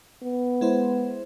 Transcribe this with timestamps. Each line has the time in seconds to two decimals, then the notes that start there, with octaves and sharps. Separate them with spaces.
0.23 B3
0.61 G#3 E4 C5